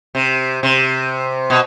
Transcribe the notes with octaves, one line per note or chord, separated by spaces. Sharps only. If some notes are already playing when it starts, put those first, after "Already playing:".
C3
C3
B2